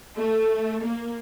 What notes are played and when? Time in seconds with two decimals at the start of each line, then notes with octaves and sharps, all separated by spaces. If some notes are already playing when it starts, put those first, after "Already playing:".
0.17 A3
0.81 A#3